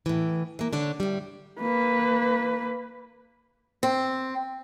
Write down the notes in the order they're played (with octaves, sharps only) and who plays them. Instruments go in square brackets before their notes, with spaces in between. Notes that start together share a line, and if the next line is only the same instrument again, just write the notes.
[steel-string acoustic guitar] A2 E3
E3 A#3
D3 D4 C#5
A2 G3
[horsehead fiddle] A#3 B4
[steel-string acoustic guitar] C4